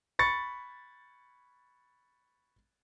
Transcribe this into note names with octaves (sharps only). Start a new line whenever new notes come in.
B5 C#6 A6 C#7